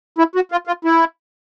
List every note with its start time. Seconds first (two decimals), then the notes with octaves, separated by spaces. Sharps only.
0.19 E4
0.35 F#4
0.52 F4
0.67 F4
0.85 E4